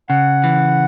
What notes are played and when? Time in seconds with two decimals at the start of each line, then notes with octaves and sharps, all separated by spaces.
0.09 C#3 F#5
0.44 E3